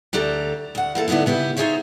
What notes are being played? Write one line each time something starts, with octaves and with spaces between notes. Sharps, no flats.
D2 D4 G4 A4 A#5
D2 F#5
E3 A#3 A4
D3 A3 B3 D#4 E4
C#3 B3 E4 G4
D#4 F4 G#4 C5 C#5 E5